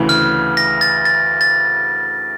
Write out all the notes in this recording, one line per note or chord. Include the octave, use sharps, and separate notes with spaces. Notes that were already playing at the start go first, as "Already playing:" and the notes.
Already playing: D2 C#3 E3
F6
A#6
A6
A6
A6